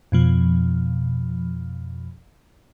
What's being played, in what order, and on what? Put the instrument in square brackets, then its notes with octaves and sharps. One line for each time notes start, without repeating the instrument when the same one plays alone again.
[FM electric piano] F2 B2 F3